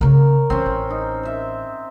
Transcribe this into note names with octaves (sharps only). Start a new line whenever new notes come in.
C#3 A#3 A#4 C#5
D3 E3 C4 C#4
A1
D#4
C5 E5